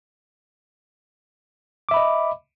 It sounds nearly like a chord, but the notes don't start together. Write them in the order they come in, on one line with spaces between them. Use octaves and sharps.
D6 E5 B5 D#5